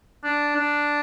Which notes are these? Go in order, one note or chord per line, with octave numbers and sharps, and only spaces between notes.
D4
D4